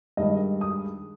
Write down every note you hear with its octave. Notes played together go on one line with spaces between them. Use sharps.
G2 D#3 G#3 D#5
D#6